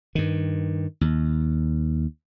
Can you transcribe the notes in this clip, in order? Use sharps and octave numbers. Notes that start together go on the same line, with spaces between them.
G2 D#3
D#2